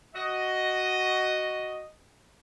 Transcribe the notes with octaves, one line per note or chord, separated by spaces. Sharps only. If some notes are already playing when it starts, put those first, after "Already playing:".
F#4 D#5